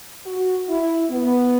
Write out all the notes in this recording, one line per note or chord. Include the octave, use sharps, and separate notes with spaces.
F#4
E4
B3